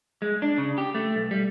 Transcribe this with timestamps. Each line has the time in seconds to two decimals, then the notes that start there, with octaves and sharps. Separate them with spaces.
0.22 G#3
0.42 D4
0.58 C#3
0.78 G4
0.95 A3
1.16 B1
1.31 G3